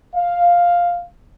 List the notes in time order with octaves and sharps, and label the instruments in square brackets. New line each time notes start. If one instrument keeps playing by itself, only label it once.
[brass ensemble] F5